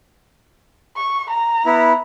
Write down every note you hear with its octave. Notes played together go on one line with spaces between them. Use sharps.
C#6
A#5
B3 E4